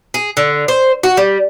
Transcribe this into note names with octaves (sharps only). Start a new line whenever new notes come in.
G#4
D3
C5
F#4
G3